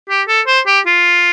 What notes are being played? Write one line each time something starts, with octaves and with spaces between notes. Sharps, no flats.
G4
A4
C5
G4
F4